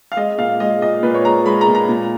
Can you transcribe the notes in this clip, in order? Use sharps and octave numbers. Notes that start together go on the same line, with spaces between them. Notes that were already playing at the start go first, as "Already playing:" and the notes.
F5
G#3 D#5
A#2 F5
G#3 D#5
A#2 D#5
A#2 B4
C#5
G#3 A#5
G#3 B5
A#5
A#2
A#5
A#2